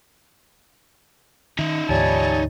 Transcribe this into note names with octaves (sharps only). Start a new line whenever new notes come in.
D#3 D#4 E5
D2 G#2 E3 G3 C#5 G#5 A5